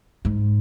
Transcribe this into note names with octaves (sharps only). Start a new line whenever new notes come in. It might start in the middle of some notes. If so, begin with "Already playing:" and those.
G#2